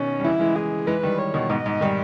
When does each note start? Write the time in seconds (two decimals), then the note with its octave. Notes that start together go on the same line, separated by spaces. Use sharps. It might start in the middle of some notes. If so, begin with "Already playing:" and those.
Already playing: B2 D#3 C#4
0.19 G3
0.24 C#3 E3 E4
0.40 E3 G#3
0.56 G#4
0.87 E3 G#3 B4
1.03 D#3 G3
1.18 C#5
1.34 B2 D#3
1.50 G#2 B2 D#5
1.66 G#2
1.81 D#3 G3